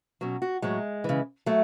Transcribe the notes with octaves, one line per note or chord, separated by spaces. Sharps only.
B2 F#3 C#4
F#4
A2 F#3 G#3
C#3 E3
F#3 A3